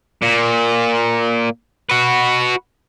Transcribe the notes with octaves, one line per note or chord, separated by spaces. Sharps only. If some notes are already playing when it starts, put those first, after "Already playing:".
A#2
F#4 B4